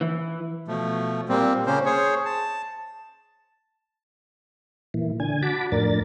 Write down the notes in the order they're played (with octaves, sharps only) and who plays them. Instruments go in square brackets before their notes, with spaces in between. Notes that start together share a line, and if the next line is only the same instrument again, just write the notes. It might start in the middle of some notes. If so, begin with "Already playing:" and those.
[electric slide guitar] E3
[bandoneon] B2 F3 A3
A#2 G3 A#3 C4
C#3 A#3 C#4 C5
G#4 C5 C#5
A5
[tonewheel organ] A#2 E3
D3 G#5
F#4 A5 B5 D6
F2 A2 D4 A#4 A6